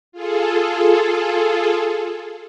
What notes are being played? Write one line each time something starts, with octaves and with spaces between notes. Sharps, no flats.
F4 G#4 A4